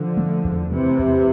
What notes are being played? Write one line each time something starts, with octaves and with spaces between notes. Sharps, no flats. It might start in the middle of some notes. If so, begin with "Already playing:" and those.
Already playing: D3 F3
A3
E2
C3 E3 A3
E2